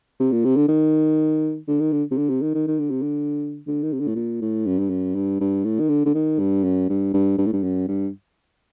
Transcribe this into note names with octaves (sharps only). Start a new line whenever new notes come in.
C3
A#2
C3
D3
D#3
D3
D#3
D3
C3
D3
C3
D#3
D#3
D#3
D3
C3
D3
D3
D#3
C3
D3
A2
A#2
A2
F#2
G2
F#2
G2
G2
A2
D#3
D3
D3
D#3
G2
F#2
G2
G2
G2
A2
G2
F#2
G2